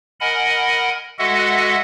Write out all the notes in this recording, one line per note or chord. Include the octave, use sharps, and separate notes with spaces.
A#4 D#5 F#5 G#5 B5
G#3 F#4 A4 D#5 E5 F#5